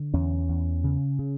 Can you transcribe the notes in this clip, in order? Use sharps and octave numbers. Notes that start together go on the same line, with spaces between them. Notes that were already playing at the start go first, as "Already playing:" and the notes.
Already playing: D3
E2 C#4
E2
C#3
C#3